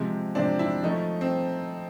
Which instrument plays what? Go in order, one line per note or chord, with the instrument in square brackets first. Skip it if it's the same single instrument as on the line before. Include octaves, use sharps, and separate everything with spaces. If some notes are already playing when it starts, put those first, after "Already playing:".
Already playing: [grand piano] C3 F3 G#3 C4
[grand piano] C3 F3 G#3 C4 [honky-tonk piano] D4
[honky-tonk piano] E4
[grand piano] F3 A3 C#4 [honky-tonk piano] D#4
[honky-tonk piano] C4